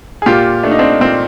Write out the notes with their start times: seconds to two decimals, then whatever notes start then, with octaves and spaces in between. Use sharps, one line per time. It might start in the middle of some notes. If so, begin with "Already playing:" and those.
0.22 G#4
0.26 A#2 F4 G4
0.64 A3 D4
0.71 D#4
0.79 C4 D4
1.01 A#2 C4